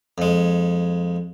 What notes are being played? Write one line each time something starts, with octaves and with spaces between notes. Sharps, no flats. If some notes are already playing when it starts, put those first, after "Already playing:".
F2 G#3